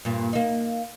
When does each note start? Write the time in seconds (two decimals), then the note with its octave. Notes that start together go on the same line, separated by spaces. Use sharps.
0.05 G2 A#2
0.33 A#3 D#4